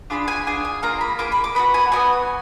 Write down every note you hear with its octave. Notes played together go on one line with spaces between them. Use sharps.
D4 F4 G#4 B5
G#5
D4 F4 G#4 G#5
G#5
A#3 F4 G#4 A#5
B5
A#3 F4 G#4 D6
B5
D6
B3 D4 F#4 B5
G#5
B3 D4 F#4 G#5